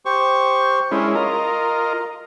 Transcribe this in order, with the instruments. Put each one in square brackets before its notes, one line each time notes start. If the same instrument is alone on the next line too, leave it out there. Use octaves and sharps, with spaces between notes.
[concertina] G4 C5 C#6
[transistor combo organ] G#3 C#4 E4 [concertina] D4 A#4 C6
[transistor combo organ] F4 A#4 D#5 [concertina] A#5